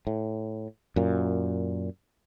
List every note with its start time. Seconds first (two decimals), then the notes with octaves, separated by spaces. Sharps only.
0.07 A2
0.96 F#2 A#2